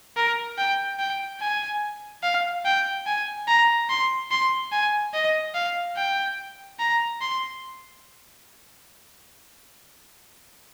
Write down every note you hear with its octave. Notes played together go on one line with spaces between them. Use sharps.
A#4
G5
G5
G#5
F5
G5
G#5
A#5
C6
C6
G#5
D#5
F5
G5
A#5
C6